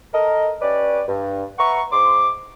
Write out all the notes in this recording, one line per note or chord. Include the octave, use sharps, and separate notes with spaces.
A4 A#4 D#5
C#4 G4 B4 C#5 D5
G2
B4 E5 F#5 A#5 C#6
G#2 C6 D6